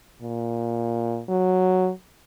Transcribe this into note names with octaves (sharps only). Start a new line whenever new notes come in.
A#2
F#3